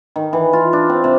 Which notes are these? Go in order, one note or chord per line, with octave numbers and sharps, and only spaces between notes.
D#3
E3
F4
D4
C4
C3